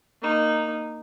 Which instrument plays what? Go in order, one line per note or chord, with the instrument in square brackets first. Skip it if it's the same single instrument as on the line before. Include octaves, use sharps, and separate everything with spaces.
[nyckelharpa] A#3 D#4